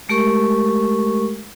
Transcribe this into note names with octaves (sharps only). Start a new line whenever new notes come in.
G#3 A3 G4 A#4 C#6